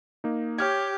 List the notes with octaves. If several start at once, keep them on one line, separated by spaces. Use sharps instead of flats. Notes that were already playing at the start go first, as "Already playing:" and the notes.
A#3 D#4
G4 C#5 F6 G#6